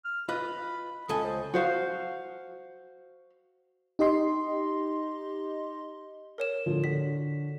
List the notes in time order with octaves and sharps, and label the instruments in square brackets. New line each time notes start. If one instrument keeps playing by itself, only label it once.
[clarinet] F6
[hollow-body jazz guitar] F4 B4 D#5 [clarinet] B5
[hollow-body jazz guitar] C#2 A4 G#5 [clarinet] D#6
[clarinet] C5
[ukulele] F#4 C5 F5
[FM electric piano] D#4 G4 D#5 C6
[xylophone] A#4 C#5 E7
[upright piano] A2 D3 F3
[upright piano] D3 F#4 [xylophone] B6